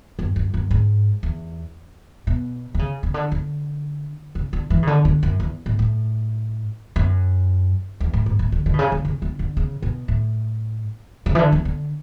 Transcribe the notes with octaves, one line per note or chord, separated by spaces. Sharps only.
F#2
F#2
F#2
G#2
E2
B2
D3
C#3
C#3
D3
D3
C#3
D3
E3
C#3
D3
D3
F#2
E2
A2
A2
F#2
E2
A2
G#2
A2
D3
D3
B2
C#3
D3
C#3
D3
D3
C#3
B2
A2
C#3
E3
D3
E3
D3